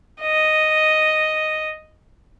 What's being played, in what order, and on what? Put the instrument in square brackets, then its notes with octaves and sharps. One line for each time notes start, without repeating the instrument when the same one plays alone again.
[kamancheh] D#5